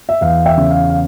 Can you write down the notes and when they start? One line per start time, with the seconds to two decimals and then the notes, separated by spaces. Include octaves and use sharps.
0.09 E5
0.21 E2 F5
0.46 E5 G5
0.57 C#3
0.71 F5
0.90 F5